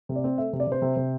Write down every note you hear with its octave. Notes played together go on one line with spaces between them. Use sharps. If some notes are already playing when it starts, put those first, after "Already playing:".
C3
D5
C4
A3 E5
C3
D5
C3 C5
C3
C3